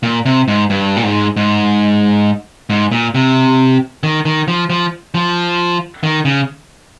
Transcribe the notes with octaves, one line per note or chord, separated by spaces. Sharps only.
A#2
C3
G#2
G2
A#2
G#2
G#2
G#2
A#2
C3
D#3
D#3
F3
F3
F3
D#3
C#3